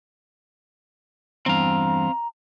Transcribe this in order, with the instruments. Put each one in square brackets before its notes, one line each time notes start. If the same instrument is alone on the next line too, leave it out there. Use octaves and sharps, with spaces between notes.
[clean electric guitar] E2 G2 [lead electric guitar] C4 F5 [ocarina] A#5